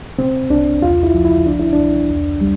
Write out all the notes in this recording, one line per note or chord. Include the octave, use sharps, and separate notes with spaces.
C3 C4
C2 D4
E2 F4
E4
F3
E4
C2 D4
E4
D4
C2
E2
G3